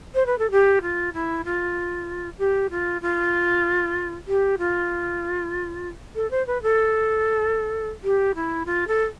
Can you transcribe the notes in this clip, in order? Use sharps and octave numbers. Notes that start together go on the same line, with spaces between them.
C5
B4
A4
G4
F4
E4
F4
G4
F4
F4
G4
F4
A4
C5
B4
A4
G4
E4
F4
A4